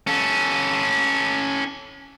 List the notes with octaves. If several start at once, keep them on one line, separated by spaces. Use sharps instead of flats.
C#4 A4